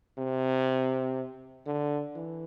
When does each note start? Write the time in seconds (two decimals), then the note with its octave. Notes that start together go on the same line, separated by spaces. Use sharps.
0.18 C3
1.66 D3
2.15 E3